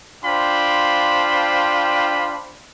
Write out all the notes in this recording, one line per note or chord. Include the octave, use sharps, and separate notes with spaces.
D4 F4 C5 G5 B5